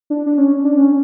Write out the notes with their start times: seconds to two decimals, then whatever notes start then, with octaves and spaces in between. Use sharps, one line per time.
0.10 D4
0.26 D4
0.38 C#4
0.64 D4
0.77 C#4